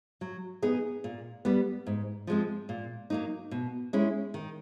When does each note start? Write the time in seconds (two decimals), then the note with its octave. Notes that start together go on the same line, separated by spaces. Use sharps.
0.21 F#3
0.62 B3 D#4 G#4
1.04 A#2
1.45 G3 B3
1.87 G#2
2.27 F3 G#3 C4
2.69 A#2
3.10 F#3 A#3 D#4
3.51 B2
3.93 G#3 C#4 E4
4.34 D#3